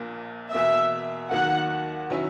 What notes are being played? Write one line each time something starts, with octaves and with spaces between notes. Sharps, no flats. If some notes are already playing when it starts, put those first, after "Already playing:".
Already playing: A#1 A#2 A#3
E2 B2 A#3 E5
D#2 D#3 F#3 A#3 F#5
D#3 F#3 C#4 E4